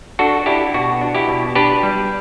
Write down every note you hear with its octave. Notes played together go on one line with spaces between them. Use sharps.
D4 F#4 A4
D4 E4 G4
B2 F#4
D4
E4 G4
B2
D4 G4 B4
G3